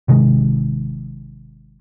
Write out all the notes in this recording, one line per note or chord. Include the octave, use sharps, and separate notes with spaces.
G#1 C3 D#3 G#3